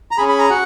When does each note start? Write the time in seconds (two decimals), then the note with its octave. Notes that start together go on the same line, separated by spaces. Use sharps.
0.11 A#5
0.18 C#4 G#4 B5
0.29 B5
0.39 A#5
0.50 F#4 F#5